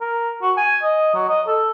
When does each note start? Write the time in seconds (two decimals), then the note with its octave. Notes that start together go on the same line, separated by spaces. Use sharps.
0.01 A#4
0.42 F#4
0.57 G#5
0.83 D#5
1.14 F#3
1.29 D#5
1.47 A4